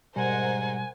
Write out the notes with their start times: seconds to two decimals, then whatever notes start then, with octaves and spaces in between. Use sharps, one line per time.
0.16 G#2 B2 G3 A#4 C5 F#5 G#5